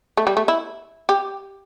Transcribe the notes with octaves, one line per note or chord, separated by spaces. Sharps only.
A3
G3
A3
E4
G4